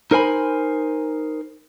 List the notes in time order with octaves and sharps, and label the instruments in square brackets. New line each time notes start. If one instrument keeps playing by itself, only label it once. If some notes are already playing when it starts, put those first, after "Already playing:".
[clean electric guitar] D#4 A#4 C5 G#5 B5